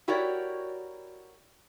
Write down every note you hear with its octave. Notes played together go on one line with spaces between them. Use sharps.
E4 F#4 G4 A#4 C#5 D5